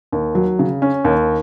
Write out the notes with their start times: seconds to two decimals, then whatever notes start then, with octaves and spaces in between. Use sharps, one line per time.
0.12 D#2
0.35 F#3
0.59 C#3
0.82 C#4
1.05 D#2